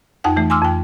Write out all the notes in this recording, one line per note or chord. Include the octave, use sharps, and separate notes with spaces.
F2 D#4 F#5 G5
E3 A3
G#5 C6 D6 E6 F6
F2 G5